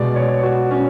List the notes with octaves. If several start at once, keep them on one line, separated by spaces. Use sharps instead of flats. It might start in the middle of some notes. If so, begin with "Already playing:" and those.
Already playing: B2 G#3 D5
C#5
F#4
C#4